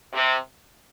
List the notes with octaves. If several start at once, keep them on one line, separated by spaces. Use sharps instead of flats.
C3